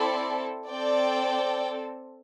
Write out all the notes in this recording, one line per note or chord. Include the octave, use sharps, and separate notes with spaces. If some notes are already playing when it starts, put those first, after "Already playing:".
Already playing: C4 E4 A4 D5
C4 A4 D5 G5